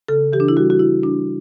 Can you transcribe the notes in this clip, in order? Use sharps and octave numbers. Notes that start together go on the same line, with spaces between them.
C#3 A4
E3 G4
D4
E4
G3 F#4
F#4
C#3 E4
G3 D4